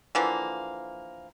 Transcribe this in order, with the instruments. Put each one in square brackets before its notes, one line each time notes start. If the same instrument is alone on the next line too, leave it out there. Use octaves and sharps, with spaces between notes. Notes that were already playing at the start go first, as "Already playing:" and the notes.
[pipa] D3 E3 F3 A#3